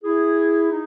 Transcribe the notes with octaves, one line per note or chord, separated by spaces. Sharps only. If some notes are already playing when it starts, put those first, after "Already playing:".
E4 G#4
D#4